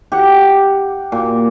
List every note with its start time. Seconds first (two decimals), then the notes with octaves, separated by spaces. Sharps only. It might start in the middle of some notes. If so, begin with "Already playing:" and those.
0.12 G4 F#5
1.12 A#2